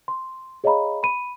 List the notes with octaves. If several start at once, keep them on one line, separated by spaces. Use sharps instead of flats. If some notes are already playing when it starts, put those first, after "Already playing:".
C6
G#4 C#5 D#5 F5 A#5 B5
B5 D#7